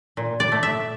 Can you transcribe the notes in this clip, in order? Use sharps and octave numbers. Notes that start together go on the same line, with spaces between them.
A#2
D5
A3
E5